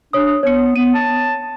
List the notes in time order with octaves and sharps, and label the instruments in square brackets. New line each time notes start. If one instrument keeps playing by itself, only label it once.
[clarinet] D4 [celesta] C#5 D#6
[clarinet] B3 [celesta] C#5 C#7
[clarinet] B3 [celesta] D#7
[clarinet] A5